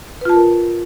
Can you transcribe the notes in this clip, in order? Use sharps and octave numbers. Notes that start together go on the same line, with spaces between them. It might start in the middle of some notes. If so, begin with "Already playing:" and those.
F4 A#4 B4 A5